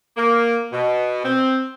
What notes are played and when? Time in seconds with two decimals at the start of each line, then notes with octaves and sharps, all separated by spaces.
0.17 A#3
0.73 B2
1.24 C4